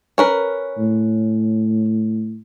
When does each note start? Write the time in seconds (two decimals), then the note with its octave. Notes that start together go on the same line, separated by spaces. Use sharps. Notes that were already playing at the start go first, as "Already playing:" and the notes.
0.18 C#4 A#4 B4
0.78 A2